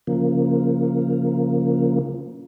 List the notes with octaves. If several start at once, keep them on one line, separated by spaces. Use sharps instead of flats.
C#3 F3 A#3